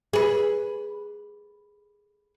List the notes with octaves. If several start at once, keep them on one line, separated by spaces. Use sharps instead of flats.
G#4 B4